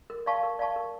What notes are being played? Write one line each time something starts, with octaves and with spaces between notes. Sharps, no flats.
A#4
D5 F5 A5 C#6
A#4
D5 F5 A5 C#6
A#4